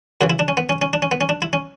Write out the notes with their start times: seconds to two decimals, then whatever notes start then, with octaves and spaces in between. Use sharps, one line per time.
0.21 F#2 C#3 E3 F#4
0.30 E4
0.39 D4
0.48 C#4
0.57 B3
0.69 C#4
0.82 C#4
0.93 D4
1.02 C#4
1.11 B3
1.21 C#4
1.29 D4
1.42 E4
1.53 C#4